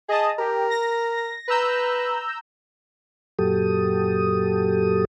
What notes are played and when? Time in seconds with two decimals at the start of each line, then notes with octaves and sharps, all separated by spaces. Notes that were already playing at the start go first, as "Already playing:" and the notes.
0.09 G#4 D#5 A5 D#6
0.38 G4 A#4
0.70 A#6
1.48 B4 A#5 E6 G6
3.39 F#2 A#2 F#3 G4 A4 D#6